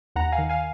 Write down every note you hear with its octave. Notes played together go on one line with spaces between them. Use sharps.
D#2 F#5 A#5
F5 G#5
D#3
F5 G#5